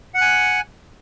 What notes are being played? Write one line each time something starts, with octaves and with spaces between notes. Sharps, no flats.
F#5 G#5 F#6